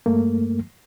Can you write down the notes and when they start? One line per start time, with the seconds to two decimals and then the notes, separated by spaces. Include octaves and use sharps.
0.06 G2 A3 A#3